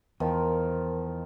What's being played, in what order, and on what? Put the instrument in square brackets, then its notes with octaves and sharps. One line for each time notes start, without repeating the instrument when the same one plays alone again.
[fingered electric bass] E2 [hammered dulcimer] D#3 F3 [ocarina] A#4